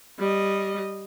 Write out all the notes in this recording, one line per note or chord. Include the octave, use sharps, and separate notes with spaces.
G3 D#5